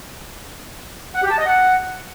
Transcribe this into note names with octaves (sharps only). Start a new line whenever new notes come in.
F#5
G4
A5
D#5
F#5